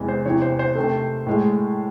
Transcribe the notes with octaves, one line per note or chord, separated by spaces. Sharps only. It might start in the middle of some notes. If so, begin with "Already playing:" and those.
Already playing: E2 C3 E3 G#3
C5
E2 C3 E3 C#5
C5
C5
C3 D#3 A3
A2 G#3